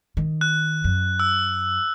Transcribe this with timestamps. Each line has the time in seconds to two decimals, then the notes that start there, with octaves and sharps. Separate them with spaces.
0.17 D#3
0.41 F#6
0.84 F#2
1.20 E6